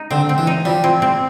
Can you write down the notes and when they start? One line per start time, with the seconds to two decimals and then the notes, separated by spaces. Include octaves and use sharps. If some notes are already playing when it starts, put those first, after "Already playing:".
Already playing: D#4
0.10 D3 C4
0.29 C4
0.38 E3
0.47 D#4
0.65 F3 G3
0.84 C4
1.02 C4